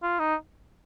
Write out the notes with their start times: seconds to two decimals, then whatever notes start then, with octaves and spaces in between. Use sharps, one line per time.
0.03 F4
0.19 D#4